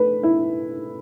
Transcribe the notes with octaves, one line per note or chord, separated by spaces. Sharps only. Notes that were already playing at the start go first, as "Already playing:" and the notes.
Already playing: A3 B4
E4